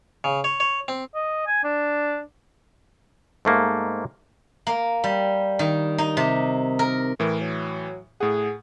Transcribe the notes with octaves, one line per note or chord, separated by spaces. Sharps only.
C#3
C#5
C#5
C4
D#5
G#5
D4
G#2 A3 A#3
A#3
G3
D#3
D#4
C3
A#4
A2 E3 A#4
F#3
A2 G#4 F#5